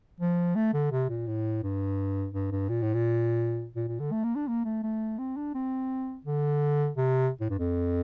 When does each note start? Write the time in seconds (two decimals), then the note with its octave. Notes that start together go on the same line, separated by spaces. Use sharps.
0.20 F3
0.55 A3
0.74 D3
0.92 C3
1.09 A#2
1.27 A2
1.63 G2
2.33 G2
2.51 G2
2.69 A#2
2.82 A2
2.94 A#2
3.76 A#2
3.88 A#2
4.00 D3
4.12 A3
4.24 A#3
4.35 D4
4.48 A#3
4.65 A3
4.83 A3
5.19 C4
5.37 D4
5.55 C4
6.25 D3
6.97 C3
7.41 A2
7.50 G2
7.59 F2